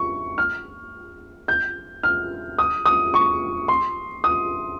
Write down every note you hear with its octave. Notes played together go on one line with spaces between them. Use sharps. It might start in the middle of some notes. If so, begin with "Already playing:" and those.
Already playing: C#6
F6
G6
F6
D#6
D#6
C#6
C6
D#6